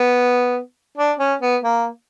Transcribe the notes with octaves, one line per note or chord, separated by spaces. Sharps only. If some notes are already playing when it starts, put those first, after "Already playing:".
Already playing: B3
D4
C#4
B3
A#3